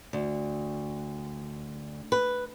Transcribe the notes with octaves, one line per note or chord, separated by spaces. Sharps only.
D2
B4